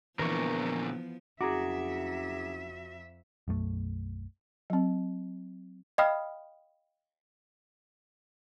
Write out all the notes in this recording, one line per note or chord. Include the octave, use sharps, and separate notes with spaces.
A#2 D3 E3 F3 B3 A#4 C#6
F#1 F2 F#4 G#4 E5 A#5 D6
B1 F#2 A3
F#3 C4
D#5 F5 G5 B5 D#6 F6